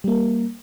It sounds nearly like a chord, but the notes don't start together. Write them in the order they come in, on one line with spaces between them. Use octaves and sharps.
G3 A#3 A#4